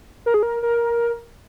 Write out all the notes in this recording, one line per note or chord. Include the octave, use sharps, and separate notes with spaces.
A#4
G#4
A#4
A#4